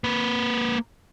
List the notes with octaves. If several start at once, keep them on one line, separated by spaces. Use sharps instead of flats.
A#3 B4